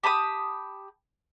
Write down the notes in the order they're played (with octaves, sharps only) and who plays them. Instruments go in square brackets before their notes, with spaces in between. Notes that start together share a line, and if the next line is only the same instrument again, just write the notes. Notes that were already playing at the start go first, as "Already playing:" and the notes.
[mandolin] G4 A5 B5 D#6